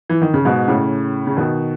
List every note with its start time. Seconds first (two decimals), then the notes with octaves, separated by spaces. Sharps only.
0.09 E3
0.22 D#3
0.34 C#3
0.45 G#2 B2
0.68 A2 C#3
1.27 C#3
1.37 B2 D#3